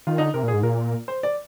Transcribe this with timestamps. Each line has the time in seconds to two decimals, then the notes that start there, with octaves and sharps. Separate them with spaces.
0.07 D#3 F4
0.18 D3 D#4
0.34 C3 A#4
0.43 A#2 G#4
0.53 G#2
0.63 A#2 A#4
1.08 C5
1.23 D5